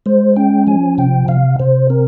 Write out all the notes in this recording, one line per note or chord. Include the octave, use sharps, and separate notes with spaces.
G#3 C5
C#4 G5
F3 G#5
C3 G5
C3 F5
C3 C5
C4 A#4